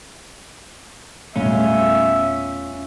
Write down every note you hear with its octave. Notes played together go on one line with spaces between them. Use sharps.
E1 A#2 G3 A3 B3 C#4 F4 E5